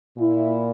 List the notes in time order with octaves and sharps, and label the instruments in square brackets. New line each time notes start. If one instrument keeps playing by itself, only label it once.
[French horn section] A#2 E4